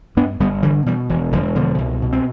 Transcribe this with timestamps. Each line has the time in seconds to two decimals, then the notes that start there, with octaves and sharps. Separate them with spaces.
0.17 G2 B3 D4
0.40 G1 G3 B3
0.62 D3 E3 G3
0.86 B2 E3 G3
1.09 E1 E3
1.32 E1 D3 F3
1.55 B2 D3 F3
1.78 C2
2.02 B2
2.13 C4